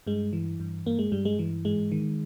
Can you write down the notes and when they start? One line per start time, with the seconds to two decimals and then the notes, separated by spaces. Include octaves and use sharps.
0.07 G2 G#3
0.33 E3
0.60 G2
0.86 G2 A#3
0.99 G#3
1.12 G2 G3
1.25 G#3
1.39 E3
1.65 G#2 G#3
1.92 D#3